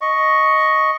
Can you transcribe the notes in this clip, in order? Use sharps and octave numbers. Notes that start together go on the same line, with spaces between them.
D#5 C#6